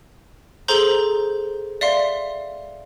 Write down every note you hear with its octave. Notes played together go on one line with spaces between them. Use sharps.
G#4 A4 C5 A#5 C6 G6
D5 E5 F5 C6